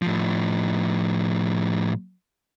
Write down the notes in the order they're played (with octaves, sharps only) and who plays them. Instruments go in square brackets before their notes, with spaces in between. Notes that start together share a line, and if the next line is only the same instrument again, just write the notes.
[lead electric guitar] A2 F3